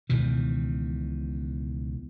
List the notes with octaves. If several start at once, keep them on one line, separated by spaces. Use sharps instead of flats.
C#2 B2 D#3 E3